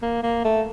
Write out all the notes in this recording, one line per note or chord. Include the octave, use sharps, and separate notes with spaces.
A#3
A#3
A3